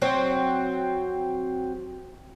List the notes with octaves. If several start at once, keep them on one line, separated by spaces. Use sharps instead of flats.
F#3 C4 F#4